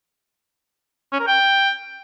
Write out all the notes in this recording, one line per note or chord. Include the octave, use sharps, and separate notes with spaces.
C#4
A#4
G5